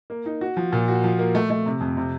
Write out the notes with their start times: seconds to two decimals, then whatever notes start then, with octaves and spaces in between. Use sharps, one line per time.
0.10 A#3
0.26 D#4
0.41 F#4
0.57 F3
0.72 A#2
0.88 F#4
1.04 F3
1.19 A#3
1.35 A3
1.50 A3
1.66 C3
1.81 F2
1.97 C3